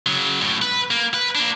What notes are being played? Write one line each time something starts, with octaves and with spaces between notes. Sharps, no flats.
C#3 F#3
F#2 A2
B4
A#3
B4
A#3 D4